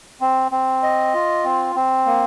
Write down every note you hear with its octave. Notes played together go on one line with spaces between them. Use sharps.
C4
C4
D#5
F4
C4
C4
A#3